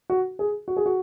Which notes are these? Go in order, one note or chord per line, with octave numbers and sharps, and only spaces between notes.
F#4
G#4
F#4
G#4
F#4